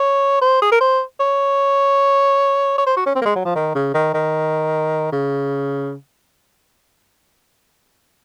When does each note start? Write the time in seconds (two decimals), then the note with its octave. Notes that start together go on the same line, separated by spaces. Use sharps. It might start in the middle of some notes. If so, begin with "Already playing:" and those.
Already playing: C#5
0.41 C5
0.62 G#4
0.71 A#4
0.80 C5
1.20 C#5
2.78 C#5
2.86 C5
2.96 F#4
3.06 C#4
3.15 C4
3.21 A#3
3.25 G#3
3.35 F#3
3.45 F3
3.55 D#3
3.75 C#3
3.94 D#3
4.14 D#3
5.12 C#3